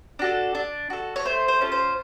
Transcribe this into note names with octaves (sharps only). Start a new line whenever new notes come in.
D4 F#4 A4
D4
F#4 A4
C#5
A3 C5
C5
C#4 F4 A4
C5